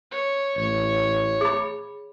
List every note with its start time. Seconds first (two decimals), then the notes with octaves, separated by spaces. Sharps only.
0.11 C#5
0.57 A1 C#5
1.41 G#4 B5